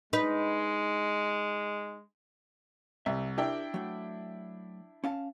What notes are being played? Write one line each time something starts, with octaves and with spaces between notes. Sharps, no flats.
G#3 D#4 B4
C2 E5
D4 E4 G4 A#4 G5
F#3 A3
C#4 F5 A5